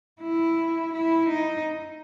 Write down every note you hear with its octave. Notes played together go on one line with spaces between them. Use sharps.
E4
E4
D#4